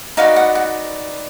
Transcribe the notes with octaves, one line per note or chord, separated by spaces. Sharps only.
D#4 F#4 B4 D5 F5
F#5
F#5